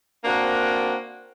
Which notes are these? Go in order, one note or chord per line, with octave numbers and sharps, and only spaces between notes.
A#3 C4 D4 F#4 A#4